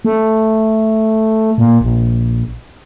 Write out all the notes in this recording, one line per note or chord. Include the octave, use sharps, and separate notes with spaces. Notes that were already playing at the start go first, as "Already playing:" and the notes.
A3
A#2
A#1